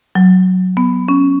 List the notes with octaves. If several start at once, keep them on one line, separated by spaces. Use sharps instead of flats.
F#3
B3
C#4